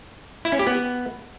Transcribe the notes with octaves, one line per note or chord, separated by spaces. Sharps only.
E4
C#4
G4
B3